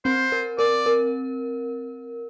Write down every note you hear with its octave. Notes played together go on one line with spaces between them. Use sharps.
C4 C5
A#4
A#4 D5
A#4